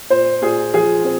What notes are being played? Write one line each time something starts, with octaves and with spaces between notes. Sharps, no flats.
A#2 C5
A#2 G#4
F3 G#4
C4